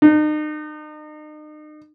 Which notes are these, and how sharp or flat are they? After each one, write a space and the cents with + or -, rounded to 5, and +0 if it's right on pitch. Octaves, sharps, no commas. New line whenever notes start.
D#4 -40